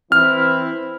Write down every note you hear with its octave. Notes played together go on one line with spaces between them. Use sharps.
E3 C4 E4 F6